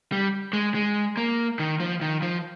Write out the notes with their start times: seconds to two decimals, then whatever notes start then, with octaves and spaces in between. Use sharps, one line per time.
0.12 G3
0.53 G#3
0.75 G#3
1.17 A#3
1.59 D#3
1.80 F3
2.01 D#3
2.22 F3